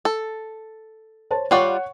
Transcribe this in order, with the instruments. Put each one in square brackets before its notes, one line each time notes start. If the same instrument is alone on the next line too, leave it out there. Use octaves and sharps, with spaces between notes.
[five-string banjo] A4
[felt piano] C5 C#5 A5
[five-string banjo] G3 F4 D5 [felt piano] C#5 F#5 C#6